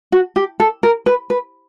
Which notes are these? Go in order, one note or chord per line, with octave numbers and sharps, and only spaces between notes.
F#4
G4
A4
A#4
B4
B4